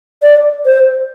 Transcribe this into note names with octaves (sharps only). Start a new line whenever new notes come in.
D5
C5